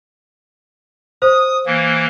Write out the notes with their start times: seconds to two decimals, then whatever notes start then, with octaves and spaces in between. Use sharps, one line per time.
1.22 C5 D#6
1.66 E3 A#3